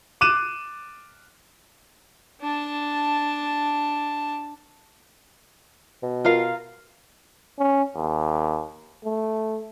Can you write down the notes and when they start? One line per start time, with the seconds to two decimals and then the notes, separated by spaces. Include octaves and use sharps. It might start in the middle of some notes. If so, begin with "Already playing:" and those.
0.21 D6 F#6 D#7 E7
2.41 D4 A5
6.03 B2
6.25 F4 A#4 F5
7.59 C#4
7.96 D#2
9.05 A3